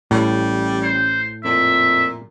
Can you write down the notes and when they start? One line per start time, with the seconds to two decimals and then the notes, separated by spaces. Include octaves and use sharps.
0.11 A1 A2 G3
0.83 C5
1.44 F2 A#2 E5